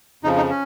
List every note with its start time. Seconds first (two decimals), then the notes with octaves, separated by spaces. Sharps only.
0.23 F2 C#3 F3 D#4
0.37 D#4
0.50 C#4